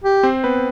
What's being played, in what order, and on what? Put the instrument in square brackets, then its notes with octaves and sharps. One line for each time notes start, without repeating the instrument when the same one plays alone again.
[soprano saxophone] G4
[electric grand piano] C4 C5
B3 B4